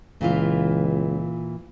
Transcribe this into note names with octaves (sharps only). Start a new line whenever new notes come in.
C#2 A#2 E3 F4